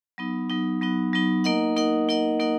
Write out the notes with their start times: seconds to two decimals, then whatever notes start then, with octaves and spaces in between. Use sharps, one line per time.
0.18 F#3 B3 D#4
0.49 F#3 B3 D#4
0.82 F#3 B3 D#4
1.13 F#3 B3 D#4
1.44 A#3 D#4 A#4 D#5 F#5
1.76 A#3 D#4 A#4 D#5 F#5
2.09 A#3 D#4 A#4 D#5 F#5
2.39 A#3 D#4 A#4 D#5 F#5